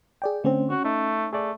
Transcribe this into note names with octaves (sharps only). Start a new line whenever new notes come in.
G#4 D5 G5
D3 A3 C4 C#4 C5
C#4 F#4
A3 D#4
A3 G#4 D5